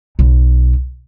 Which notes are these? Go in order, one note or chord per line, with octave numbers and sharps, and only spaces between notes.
B1